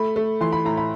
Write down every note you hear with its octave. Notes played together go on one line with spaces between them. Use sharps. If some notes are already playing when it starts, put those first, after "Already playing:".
Already playing: A3 B5
A3
E3 C6
B5
A2 A#5
B5